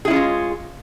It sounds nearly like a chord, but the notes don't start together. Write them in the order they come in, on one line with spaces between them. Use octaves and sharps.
G#4 E4 C#4 F4 G#3